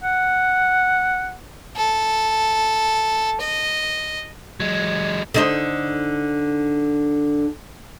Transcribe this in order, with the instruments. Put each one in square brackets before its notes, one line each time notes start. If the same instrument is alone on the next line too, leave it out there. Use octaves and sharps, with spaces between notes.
[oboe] F#5
[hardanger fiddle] A4
D#5
[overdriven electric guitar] F#3 G#3
[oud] D3 D#4 C5